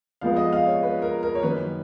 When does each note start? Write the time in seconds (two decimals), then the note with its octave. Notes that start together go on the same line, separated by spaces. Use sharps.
0.21 F2 F3 G#3 B3 F5
0.37 D#5
0.53 F5
0.67 C#5
0.83 B4
1.02 A#4
1.23 A#4
1.35 C#5
1.43 F#2 D#3 F#3 A#3 C#4 B4